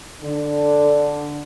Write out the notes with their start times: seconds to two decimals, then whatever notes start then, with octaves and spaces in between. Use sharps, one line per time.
0.22 D3